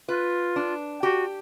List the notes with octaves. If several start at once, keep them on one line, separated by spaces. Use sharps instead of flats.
F4 B4
D4
F#4 G4